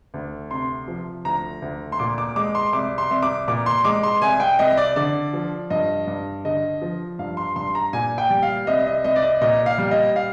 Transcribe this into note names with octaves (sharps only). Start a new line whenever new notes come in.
D2
C3 C6
F3
D2 A#5
D2
C6
A#2 D6
D6
G#3 D6
C6
C2 D6
C6
C2
D6
A#2 D6
C6
G#3 D6
C6
C2 G#5
G5
C2 D#5
D5
D3 D5
F3
G2 D#5
G2
D3 D#5
F3
G2 F5
C6
G2 C6
A#5
A#2 G#5
G5
G3
F5
C2 D#5
D#5
C2 D#5
D5
D#5
A#2 D#5
F5
G3
D#5
F5